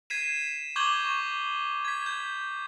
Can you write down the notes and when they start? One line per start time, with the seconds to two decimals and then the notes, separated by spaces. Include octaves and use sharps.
0.10 G#6 B6 C7 D#7 E7
0.76 C#6 D6 G6 G#6 F#7 G7
1.04 C#6
1.85 G#6 B6
2.06 G6